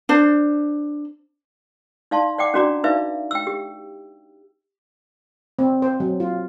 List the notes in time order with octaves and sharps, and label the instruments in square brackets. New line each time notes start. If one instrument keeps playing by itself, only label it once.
[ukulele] D4 C5
[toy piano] D#4 D5 F5 A5 C6
D5 F#5 G5 D6
C#4 D4 F#4 D5 A#5 D6
D#4 B4 D5 E5 F5
G5 E6
G4
[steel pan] C4
C5
F#3
F4